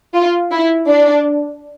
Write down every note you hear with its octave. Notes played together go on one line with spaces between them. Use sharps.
F4
E4
D4